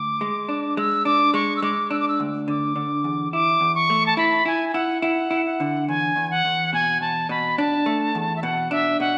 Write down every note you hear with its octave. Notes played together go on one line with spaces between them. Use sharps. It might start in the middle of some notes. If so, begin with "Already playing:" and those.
Already playing: D2 D6
G#3
D4
G#3 E6
D4 D6
G#3 C#6
E6
G#3 D6
D4 E6
D6
E6
D2
D3 D6
D3
E2
E4 D6
E2
C#6
A3
A5
E4 B5
E4 G#5
G#5
E4 F#5
E4 F#5
E4
F#5
D3
E2 G#5
E2
F#5
E2
B2 G#5
E2 A5
B2 B5
D4 A5
A3
E2
E5
B2 F#5
D4 E5
B2 F#5